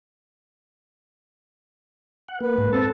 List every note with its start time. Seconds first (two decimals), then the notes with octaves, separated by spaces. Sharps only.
2.28 F#5
2.41 A#3 B4
2.58 G#2
2.73 C4 A4 A5